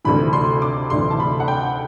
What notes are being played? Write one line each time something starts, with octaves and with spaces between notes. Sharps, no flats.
D2 C3 E3 B5
C6
D6
D2 C3 E3 C6
A5
B5
F#5
G5